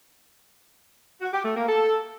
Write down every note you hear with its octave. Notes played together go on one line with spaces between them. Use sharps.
F#4
G4
A3
A#3
A4